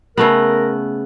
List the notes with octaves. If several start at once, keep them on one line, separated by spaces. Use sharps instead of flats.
C#3 A3 B3 A#4